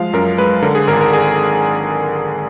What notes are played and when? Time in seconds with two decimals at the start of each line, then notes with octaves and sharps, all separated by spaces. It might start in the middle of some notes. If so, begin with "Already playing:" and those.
Already playing: F3 G#3 F5
0.13 F#2 A#4
0.38 G#3 B4
0.62 D3 A#4
0.75 G#4
0.87 G#1 A#4
1.01 A#4
1.13 G#4